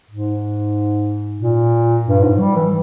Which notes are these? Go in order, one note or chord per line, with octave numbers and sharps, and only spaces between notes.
G#2
A#2
G2
G#2
G3
E3